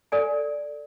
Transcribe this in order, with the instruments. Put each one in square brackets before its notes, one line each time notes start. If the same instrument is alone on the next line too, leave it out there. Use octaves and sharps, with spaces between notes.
[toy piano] A4 D5 G#5